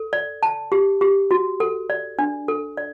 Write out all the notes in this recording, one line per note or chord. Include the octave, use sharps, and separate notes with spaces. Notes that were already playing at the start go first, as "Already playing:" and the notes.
Already playing: A4
D5
A5
G4
G4
F#4
A4
D5
D4
A4
D5